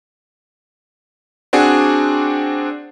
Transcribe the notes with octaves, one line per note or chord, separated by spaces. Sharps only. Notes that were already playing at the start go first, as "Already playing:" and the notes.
C4 D4 F#4 G#4